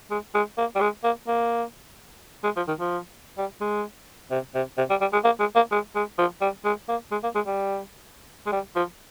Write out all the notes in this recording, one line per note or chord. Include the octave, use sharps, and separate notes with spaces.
G#3
G#3
A#3
G3
G#3
A#3
A#3
G#3
F3
D#3
F3
G3
G#3
C3
C3
C3
G3
G3
G#3
A#3
G#3
A#3
G#3
G#3
F3
G3
G#3
A#3
G#3
A#3
G#3
G3
G#3
G3
F3